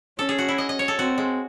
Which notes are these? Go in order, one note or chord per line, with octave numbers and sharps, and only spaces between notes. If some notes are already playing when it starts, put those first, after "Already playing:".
C#4 A4
G#4
F#4
E4
D#5
D#5
C#5
A4
C4 F#4
G#3